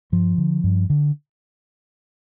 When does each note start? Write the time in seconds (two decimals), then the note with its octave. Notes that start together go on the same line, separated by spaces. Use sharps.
0.12 G2 F3
0.38 D3
0.64 G2
0.90 D3